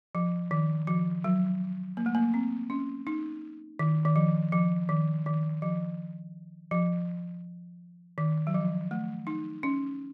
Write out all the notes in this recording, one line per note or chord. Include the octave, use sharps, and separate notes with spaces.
F3
D#3
F3
F#3
A#3
A3
A#3
C4
C#4
D#4
D#3
D#3
F3
F3
D#3
D#3
F3
F3
D#3
F#3
F3
A3
D#4
C#4